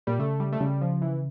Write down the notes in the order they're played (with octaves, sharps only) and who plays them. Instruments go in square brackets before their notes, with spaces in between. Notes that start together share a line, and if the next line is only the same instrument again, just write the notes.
[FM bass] A#2 [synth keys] G3
[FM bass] C#3 [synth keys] A3
[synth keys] G3
A3
[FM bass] C#3 [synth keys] G3
[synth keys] F3
E3